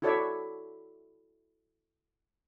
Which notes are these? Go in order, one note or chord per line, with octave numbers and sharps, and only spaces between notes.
E4 F#4 A4 C#5 D5 E5